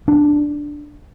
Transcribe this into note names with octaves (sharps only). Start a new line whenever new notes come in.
D4